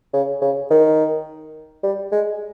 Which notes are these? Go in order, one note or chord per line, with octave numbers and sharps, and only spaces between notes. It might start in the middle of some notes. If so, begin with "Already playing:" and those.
C#3
C#3
D#3
G3
G#3